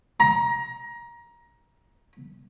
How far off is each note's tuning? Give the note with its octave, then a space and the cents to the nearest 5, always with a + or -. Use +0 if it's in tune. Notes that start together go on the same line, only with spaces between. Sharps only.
A#5 +20